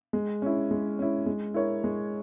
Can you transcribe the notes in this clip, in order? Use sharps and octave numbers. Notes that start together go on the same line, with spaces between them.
G#3
C#4 E4
G#3
C#4 E4
G#3
E4 A#4 C#5
G#3